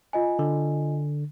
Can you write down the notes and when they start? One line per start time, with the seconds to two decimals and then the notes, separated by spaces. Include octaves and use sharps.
0.13 F4 D#5 G#5
0.39 D3